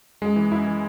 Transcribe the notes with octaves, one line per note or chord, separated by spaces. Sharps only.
F#2 G#3
E3
F#2 E4
E3